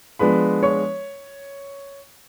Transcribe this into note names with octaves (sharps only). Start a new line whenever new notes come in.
F3 G#3 B3 D4 B4 B5
C#5 C#6